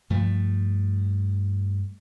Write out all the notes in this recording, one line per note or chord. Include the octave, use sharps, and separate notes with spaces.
G2 F3 A3